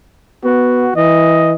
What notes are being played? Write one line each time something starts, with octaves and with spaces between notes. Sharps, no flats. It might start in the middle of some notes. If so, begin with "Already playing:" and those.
B3 F#4
E3 D#5